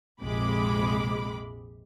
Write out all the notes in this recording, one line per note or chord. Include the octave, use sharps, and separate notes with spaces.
A#1 F2 C3 G#3 B5 D6